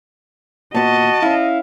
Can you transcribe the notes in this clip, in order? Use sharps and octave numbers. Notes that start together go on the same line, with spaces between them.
A#2 B3 F#4 D#5 A5
C#4 E4 F5